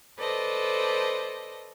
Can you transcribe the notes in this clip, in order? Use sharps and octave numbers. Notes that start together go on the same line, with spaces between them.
A4 B4 C5 D5 D#5